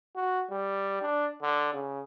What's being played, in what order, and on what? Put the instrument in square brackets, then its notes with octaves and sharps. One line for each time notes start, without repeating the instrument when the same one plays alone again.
[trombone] F#4
G3
D4
D3
C#3